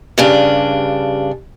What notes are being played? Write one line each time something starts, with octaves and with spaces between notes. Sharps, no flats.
G2 C#3 D4